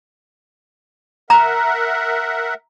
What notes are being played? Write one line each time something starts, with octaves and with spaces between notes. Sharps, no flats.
A#4 E5 F#5 A#5